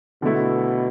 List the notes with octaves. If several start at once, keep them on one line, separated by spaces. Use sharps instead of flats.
B2 D3 A3 E4